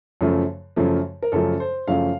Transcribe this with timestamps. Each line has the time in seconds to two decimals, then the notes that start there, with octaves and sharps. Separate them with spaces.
0.21 F#2 C#3 F3 A3
0.76 F#2 C#3 F3 A3
1.22 A#4
1.32 F#2 C#3 F3 A3 A4
1.60 C5
1.88 F#2 C#3 F3 A3 F5